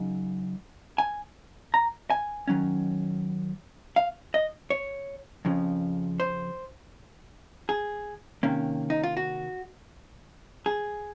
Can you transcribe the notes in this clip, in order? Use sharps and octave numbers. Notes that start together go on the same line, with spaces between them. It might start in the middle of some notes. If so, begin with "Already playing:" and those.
Already playing: C#3 F#3 D#4
G#5
A#5
G#5
D#3 F#3 C#4
F5
D#5
C#5
F2 C#3 F3
C5
G#4
C3 D#3 A#3 C#4
D#4
F4
F#4
G#4